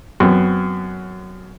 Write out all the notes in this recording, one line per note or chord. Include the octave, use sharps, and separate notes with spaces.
F#2 B3 C4